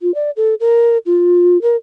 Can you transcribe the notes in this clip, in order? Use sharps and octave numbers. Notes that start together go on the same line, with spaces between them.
F4
D5
A4
A#4
F4
A#4